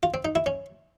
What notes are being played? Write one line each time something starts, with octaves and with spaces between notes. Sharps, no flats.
F4
C4
D#4
E4
C#4